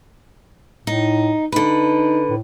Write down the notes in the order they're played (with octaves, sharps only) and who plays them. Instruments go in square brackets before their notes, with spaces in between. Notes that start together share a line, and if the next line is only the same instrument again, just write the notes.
[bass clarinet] A2 [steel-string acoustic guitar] D#4
[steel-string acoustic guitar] D3 B4 [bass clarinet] D#4
[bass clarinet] A2